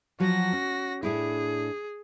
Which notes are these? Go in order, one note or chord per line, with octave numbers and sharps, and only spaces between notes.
F3 F#3 F#4 A#6
C#4
A2 D4 E4 G#4